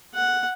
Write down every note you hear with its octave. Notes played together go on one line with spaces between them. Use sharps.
F#5